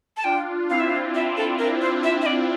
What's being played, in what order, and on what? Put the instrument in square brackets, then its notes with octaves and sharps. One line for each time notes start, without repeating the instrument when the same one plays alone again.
[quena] A5
[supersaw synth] D4 F4 [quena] G5
[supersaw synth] C4 E4 [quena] F5
[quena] E5
F5
[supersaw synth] D4 F4 [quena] E5
[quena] A4
[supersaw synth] C4 E4 [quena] A#4
[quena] C5
E5
E5
D5